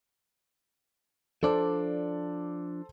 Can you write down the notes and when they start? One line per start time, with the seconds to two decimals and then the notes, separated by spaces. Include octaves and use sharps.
1.43 F3 D4 A4 C5 D5 A5